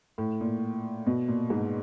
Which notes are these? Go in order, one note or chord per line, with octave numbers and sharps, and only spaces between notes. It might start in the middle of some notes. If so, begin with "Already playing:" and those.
A2
A#2
B2
A#2
G#2